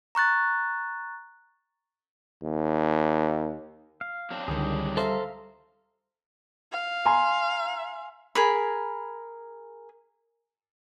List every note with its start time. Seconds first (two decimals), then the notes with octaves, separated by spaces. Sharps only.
0.15 A#5 C#6 F#6 A6
2.42 D#2
4.01 F5
4.31 F#3 C4 D4
4.48 C#2 D3 D#3 G3 G#4
4.97 A4 C5 E5 F5 A#5
6.72 F5
7.05 G#5 A#5 C6
8.35 G#4 A#4 B5